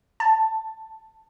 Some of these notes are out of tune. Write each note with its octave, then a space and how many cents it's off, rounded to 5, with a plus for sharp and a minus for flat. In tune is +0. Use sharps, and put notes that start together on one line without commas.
A5 +10